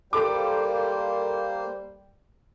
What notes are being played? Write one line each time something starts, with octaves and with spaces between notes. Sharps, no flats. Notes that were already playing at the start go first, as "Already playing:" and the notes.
G3 A#3 A4 C5 B5 D6